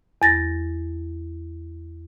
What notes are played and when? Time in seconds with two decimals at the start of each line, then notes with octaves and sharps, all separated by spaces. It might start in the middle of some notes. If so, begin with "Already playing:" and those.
0.22 E2 A6 A#6